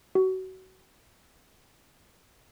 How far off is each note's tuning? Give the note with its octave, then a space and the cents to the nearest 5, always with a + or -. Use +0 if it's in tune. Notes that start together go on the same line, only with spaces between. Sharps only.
F#4 +25